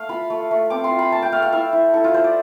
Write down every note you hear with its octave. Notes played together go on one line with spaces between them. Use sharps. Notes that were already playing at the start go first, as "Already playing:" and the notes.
Already playing: A3 F5
F4 B5
A3
A3
C4 D6
C6
F4
B5
A3 A5
G5
A3 F5
F5
E4 E5
E4
E4 A4
F4
E4 C5
D5